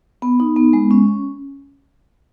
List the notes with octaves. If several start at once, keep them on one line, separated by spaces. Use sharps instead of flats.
B3
D#4
B3
G#3
C#4